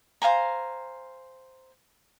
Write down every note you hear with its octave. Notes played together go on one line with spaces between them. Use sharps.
C5 F5 G#5 A#5